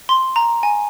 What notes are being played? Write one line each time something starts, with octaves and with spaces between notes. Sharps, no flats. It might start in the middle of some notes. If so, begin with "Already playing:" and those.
C6
A#5
G#5